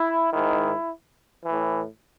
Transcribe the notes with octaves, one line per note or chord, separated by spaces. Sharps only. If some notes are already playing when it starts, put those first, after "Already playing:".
Already playing: E4
G#2 D#3 E4
A2 E3